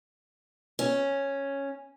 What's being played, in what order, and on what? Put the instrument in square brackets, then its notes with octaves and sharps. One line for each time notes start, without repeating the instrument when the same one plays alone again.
[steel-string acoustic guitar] C#4